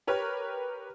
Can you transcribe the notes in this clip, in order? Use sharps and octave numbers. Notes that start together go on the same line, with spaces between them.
G4 A#4 B4 C#5 F6